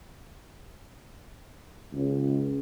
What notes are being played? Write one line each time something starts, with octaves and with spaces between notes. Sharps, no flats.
C#2